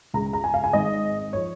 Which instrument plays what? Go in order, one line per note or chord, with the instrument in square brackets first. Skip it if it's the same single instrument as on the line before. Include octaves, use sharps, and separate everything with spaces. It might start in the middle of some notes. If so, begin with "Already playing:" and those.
[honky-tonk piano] C#2 C#3 G#3 A#5
A#5
G#5
F5
G#5
G#1 G#2 G#3 D#5
F3 C#5